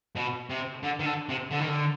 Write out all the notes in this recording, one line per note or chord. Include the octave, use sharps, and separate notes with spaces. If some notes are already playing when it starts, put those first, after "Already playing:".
B2
C3
D3
D#3
D3
C3
D3
D#3
D3